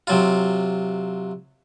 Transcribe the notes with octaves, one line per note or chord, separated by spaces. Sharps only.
C3 F#3 F4